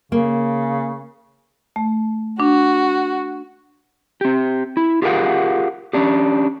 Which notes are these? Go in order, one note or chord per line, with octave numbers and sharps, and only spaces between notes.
C#3 A#3
A3
D4 F#4
C4 G4
E4
F4 G4 G#4 A#4 F5 F#5
C#4 D4 G4